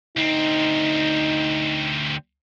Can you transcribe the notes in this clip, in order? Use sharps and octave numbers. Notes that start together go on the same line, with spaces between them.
D2 C4 D#4